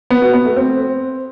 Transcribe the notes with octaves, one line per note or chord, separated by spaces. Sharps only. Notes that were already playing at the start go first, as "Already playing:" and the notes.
B3
F#4
B3
A3
C4